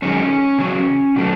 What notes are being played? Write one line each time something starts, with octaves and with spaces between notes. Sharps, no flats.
F#2 D#3 G#3 C#4
E2 C#3 F#3
B2 F#3 A3